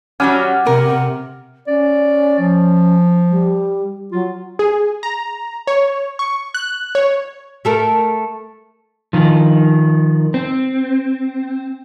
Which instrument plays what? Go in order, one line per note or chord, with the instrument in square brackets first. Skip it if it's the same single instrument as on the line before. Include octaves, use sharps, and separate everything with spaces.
[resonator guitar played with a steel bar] F#3 G3 C#4 [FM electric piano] F#5 D6 F6
[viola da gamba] C3 [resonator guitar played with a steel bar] A#4
[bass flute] C#4 [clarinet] D5
[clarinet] F3
[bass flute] G3
[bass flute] F#3 [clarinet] F4
[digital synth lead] G#4
A#5
C#5
C#6
F#6
C#5
[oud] A3 A4 A#4
[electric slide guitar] D#3 F3
C4